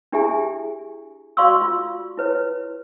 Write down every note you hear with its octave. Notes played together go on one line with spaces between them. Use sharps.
D4 E4 G4 G#4 E5 G#5
F#4 D5 F5 C6 C#6 E6
F4
E4 B4 C#5